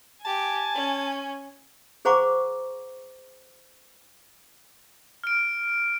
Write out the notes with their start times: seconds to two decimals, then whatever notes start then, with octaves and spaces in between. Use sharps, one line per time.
0.25 G4 G#5 A5
0.75 C#4
2.05 G#4 C5 F#5 A#5 C#6 D6
5.24 F6 D7